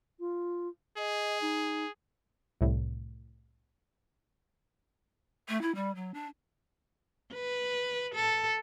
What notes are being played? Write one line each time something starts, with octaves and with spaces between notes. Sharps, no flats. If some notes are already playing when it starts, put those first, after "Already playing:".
F4
G#4 D#5
D#4
C2 A2
A3
E4
G3
F#3
D4
B4
A4